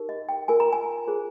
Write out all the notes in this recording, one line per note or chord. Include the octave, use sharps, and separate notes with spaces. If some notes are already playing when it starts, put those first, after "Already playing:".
Already playing: D#4 G4 A#4
D#5
G5
F4 A#4 G#5
A#5
G#5
F4 G#4 C5